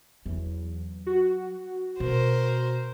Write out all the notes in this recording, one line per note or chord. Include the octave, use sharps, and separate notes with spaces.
E2 F#3
F#4
B2 A#4 C5